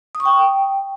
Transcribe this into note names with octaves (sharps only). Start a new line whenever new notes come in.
D#6
C#6
G5